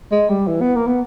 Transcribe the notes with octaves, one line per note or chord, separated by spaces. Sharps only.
G#3
G3
E3
B3
A#3
B3